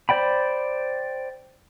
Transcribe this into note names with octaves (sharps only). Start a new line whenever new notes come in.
C5 D5 G5 B5